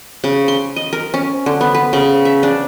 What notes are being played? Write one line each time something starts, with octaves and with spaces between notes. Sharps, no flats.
C#3
C6
D#5
A#4
C#4
D3
B3
B4
C#3
E5
D4